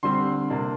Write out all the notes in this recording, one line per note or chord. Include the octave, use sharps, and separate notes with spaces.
D3 G3 C4 C6
C3 A#3 D4